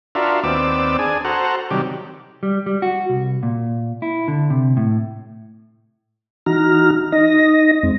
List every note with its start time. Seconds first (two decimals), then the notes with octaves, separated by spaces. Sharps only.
0.15 D4 F4 F#4 A#4 E5
0.44 D#2 B3 C4 D5 D6 E6
0.99 D4 G#4 G#5
1.25 F#4 A4 C5 F#5 A#5
1.71 C3 D#3 F#3 G3 G4
2.43 G3
2.66 G3
2.82 F#4
3.10 C2
3.43 A#2
4.02 E4
4.28 D3
4.50 C3
4.77 A2
6.46 E3 D#4 F#4 A#5 F6
7.12 D#4 D#5 A#6
7.83 F2 G#3 C4